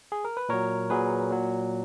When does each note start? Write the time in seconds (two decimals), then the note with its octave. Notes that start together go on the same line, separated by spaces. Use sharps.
0.12 G#4
0.25 A#4
0.37 B4
0.49 A#2 F#3 A#4 C#5
0.90 A#2 F#3 G#4 B4
1.30 A#2 F#3